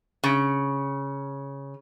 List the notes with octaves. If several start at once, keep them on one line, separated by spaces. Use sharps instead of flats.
C#3